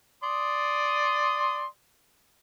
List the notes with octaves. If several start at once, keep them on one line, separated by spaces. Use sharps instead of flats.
D5 C6 D#6